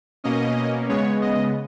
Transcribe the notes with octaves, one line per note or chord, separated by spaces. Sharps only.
B2 A#3 C#4 D#5
C#3 G#3 B3 C#5
D#5